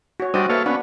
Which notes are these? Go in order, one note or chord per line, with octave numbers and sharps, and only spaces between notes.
F#4 C#5
G3 D4 F#4 C5 D#5
A#3 A4 B4 C#5 E5 F5
B3 C#4 D4 F#5